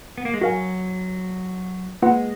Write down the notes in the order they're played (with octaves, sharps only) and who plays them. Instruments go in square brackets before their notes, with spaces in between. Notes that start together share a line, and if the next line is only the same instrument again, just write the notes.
[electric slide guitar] B3
A#3
G#3
[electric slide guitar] F#3 [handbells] F#4 A#4 F5 G#5
[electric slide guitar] G#3 [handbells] A#3 F4 B4 F#5